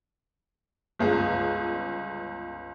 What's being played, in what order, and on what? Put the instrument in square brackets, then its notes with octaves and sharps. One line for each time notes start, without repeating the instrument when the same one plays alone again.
[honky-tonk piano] G1 C#2 G#4